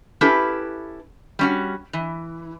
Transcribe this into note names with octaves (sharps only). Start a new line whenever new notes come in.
C#4 E4 G4 A4 B4 A5
G3 C#4 F#4
E3